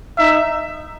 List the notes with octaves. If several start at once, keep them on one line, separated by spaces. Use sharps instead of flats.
D#4 E5